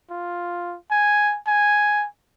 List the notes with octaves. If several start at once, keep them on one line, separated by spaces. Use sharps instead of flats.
F4
G#5
G#5